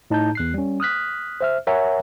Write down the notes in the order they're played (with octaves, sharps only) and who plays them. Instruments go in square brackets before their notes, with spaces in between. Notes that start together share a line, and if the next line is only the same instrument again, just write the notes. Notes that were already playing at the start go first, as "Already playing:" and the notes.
[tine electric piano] A2 D#4 A5 A#5 G6
E2 F#6 C7
G3 C#4
D#6 F6 F#6 B6
C5 E5 F6
A#4 C#5 E5 F#5 G#5 A#5